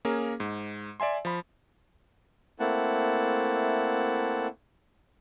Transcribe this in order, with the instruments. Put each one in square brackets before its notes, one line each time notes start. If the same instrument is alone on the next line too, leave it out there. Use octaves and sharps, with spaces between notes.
[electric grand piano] A#3 C#4 G#4 A#4
G#2
D5 E5 G#5 C6
F3 B5
[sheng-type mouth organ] A3 A#3 C4 E4 F#5 A5